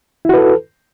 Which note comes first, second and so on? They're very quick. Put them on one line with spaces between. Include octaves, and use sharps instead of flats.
E4 F#4 B4 A4